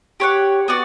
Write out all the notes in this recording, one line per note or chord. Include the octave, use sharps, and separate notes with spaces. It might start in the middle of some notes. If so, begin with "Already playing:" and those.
G4 C#5 F#5
B3 F#4 D5